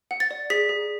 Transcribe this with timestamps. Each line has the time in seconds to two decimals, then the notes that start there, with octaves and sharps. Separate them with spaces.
0.11 F#5
0.20 A6
0.31 D5
0.50 G#4 B6
0.69 G#4